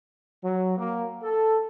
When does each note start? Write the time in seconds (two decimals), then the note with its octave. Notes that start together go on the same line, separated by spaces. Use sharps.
0.43 F#3
0.77 A#3
1.22 A4